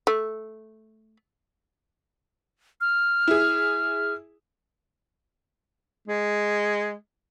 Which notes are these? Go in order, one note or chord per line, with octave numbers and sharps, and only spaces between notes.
A3
F6
E4 G#4
G#3